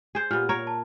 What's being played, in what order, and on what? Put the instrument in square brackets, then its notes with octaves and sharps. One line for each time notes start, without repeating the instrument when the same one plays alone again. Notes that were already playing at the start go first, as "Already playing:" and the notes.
[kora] G#4 C5
[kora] A#2 B3 [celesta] G4 F6
[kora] A#4 C#5 [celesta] A#5
[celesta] A5